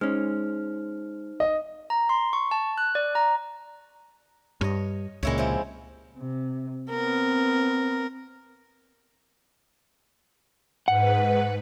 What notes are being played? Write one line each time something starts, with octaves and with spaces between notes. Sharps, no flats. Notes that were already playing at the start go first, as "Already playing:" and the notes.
G#3 C#4 D#4 C5 F6
D#5
A#5
C6
C#6
A5
F#6
D5
A#5
G2 C#5 D#5
C#2 A#2 G#3 E4 C#5
C3 F3 E4
C3
B3 C4 A#4
G#2 B4 F#5